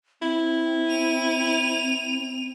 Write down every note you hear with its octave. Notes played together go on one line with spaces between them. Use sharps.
C4 E4
D#7 F7